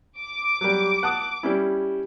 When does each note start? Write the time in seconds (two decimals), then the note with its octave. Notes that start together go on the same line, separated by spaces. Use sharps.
0.19 D6
0.61 F#3 G3
1.03 F#5 A5 D#6
1.43 G3 C#4 E4